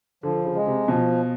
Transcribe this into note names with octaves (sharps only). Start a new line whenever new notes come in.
D3 F3
C#3
G#3
C3
B2 F3